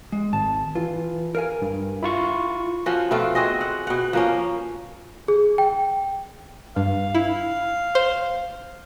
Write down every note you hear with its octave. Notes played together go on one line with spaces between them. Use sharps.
G#3
G#1 A5
E3 F4
A#4 F5 G#5
G2
E4 F4 C#6
F3 C#4 F#4
B2 A3 C4 F4
C4 F#4 G#4 D#5
F#5
B2 F#5
F3 A#3 C#4
G#4
G5
G2 F5
E4
C5